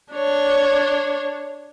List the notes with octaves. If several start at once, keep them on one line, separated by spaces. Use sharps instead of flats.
D4 C#5